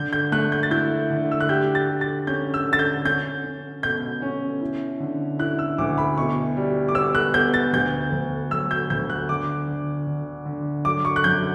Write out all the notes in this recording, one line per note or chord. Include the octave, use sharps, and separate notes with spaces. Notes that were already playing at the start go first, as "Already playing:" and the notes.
Already playing: D3 G6
G6
A3 F#6
G6
A6
E4 G6
D3
E6
F#6
G4 G6
A6
G4
A6
C#4 G6
E6
D3
A6
G6
C#4 G6
C#4
B2 G6
C#4
E4
D3
E4 F#6
E6
D2 D6
B5
B2 C#6
G3
D6
B3 E6
F#6
B3 G6
A6
D2 G6
D2
F#3 E6
G6
D2 G6
F#6
D3 D6
D3
D3
D3
F#3 D6
C#6
F#6
F#2 G6